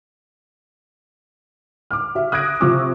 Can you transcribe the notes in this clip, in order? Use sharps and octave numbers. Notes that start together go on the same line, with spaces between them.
D6 F6
F#4 E5
D#6 F#6 G#6 A#6 D7
C3 F3 F4 C#6 D6 E6